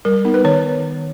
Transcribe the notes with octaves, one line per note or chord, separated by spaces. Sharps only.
G3 A#4
B3 D#4
B4
D#3 C#5